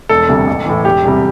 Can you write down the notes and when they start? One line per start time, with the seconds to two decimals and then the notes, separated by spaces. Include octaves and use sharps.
0.09 E1 A4
0.29 D2 C3 G3
0.47 A1
0.66 A2 E3
0.85 E1 G4
1.04 E2 C3 G3